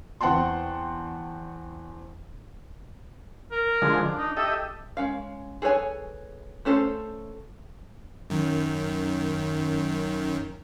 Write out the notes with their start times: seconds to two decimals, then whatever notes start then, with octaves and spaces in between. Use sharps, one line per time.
0.21 E2 C4 F#5 G5 A5 C6
3.51 A#4
3.82 D3 F3 G#3
4.06 D4
4.18 D#4
4.37 G4 A4 D#5 E5
4.97 G#3 C#4 F5
5.62 G#4 A4 B4 C#5 G#5
6.65 A3 C#4 A4 A#4 C5
8.30 F#2 D#3